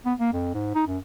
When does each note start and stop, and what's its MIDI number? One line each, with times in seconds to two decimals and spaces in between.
0.05 0.13 59
0.19 0.33 58
0.33 0.51 41
0.54 0.75 44
0.75 0.82 63
0.87 0.98 42